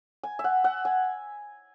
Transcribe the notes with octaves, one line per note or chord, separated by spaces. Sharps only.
G#5
E5
F#5
F#5
G#5